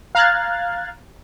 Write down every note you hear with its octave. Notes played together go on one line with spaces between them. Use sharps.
F5 A#5 F6 F#6 G#6 A6